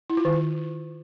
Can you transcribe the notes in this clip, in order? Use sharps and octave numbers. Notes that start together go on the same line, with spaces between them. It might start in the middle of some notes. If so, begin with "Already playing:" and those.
E4
F4
D#3